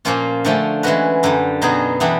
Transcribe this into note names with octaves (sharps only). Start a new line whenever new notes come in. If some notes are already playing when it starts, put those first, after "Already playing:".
A#2 F3 A#3 C#4 F4
D3 F3 A3 C#4
E3 G#3 C#4 F#4 B4
F#2 D3 G3
B2 F#3 B3 D#4 G#4
E3 G3 B3 D4